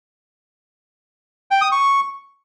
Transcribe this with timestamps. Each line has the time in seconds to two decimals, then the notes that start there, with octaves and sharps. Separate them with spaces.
1.51 G5
1.61 D#6
1.72 C#6